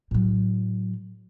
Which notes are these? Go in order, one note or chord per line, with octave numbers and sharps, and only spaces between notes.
A2 F#3